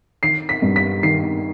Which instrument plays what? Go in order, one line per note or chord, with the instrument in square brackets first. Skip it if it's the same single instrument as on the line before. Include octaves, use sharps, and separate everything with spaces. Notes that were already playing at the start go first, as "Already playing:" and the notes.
[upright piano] D#3 C7
B6
G2
B6
D#3 C7